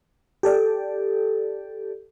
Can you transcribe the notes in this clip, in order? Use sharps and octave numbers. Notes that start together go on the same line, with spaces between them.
G4 A4 D5